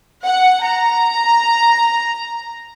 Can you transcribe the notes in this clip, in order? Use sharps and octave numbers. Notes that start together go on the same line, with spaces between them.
F#5
A#5